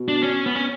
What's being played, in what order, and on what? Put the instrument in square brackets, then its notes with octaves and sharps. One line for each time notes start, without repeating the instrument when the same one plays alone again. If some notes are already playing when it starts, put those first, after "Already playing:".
Already playing: [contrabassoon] B2
[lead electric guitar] D4
C#4
B3
C#4